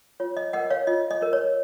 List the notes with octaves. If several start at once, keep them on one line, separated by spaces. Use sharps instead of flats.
F4 C#5
D#5
A#4 C#5 D#5 F#5
C#5 F5
F4 D#5
D#5
A#4 C#5
C#5